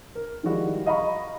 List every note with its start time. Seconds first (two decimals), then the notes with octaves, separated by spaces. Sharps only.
0.15 A#4
0.43 D#3 F3 G3 G#3 E4 F#4
0.86 D#5 F5 A#5 B5 C#6